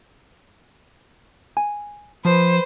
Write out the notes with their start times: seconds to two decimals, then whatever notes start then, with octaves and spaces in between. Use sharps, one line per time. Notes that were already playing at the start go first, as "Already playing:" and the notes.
1.57 G#5
2.25 F3 B4 C5